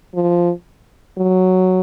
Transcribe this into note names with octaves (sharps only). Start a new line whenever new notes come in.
F3
F#3